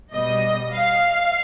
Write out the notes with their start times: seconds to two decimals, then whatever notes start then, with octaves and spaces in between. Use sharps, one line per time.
0.14 B2 G3 D#5
0.74 F5